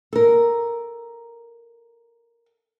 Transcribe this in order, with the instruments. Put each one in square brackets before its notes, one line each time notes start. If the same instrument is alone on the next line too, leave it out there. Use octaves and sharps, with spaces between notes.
[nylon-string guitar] A4 A#4